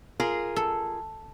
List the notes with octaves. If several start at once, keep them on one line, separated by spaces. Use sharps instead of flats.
F4 G#4 A#4
A4